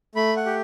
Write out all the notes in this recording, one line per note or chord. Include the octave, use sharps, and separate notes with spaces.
A3 B5
F#5
G4